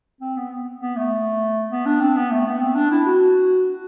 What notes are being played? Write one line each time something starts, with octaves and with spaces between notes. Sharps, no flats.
C4
B3
B3
A3
B3
D4
C4
B3
A3
B3
C4
D4
E4
F#4